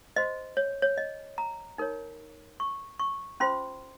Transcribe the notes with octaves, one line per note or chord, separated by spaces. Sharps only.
F#4 C5 D#5
C#5
C#5
D#5
A#5
D#4 A#4 C#5
C#6
C#6
C#4 F4 C5 C6